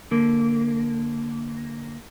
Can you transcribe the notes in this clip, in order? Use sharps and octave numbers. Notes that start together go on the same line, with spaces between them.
D3 A#3